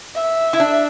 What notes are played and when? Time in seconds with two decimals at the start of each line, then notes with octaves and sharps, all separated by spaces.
0.16 E5
0.53 E4
0.60 D4